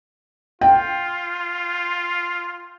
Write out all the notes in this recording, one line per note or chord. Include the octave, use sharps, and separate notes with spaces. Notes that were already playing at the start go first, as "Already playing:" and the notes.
F4 G5